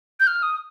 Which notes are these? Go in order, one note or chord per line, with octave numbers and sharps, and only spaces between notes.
G6
F6
D#6